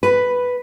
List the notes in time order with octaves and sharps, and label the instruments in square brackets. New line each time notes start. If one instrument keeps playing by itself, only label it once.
[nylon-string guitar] B4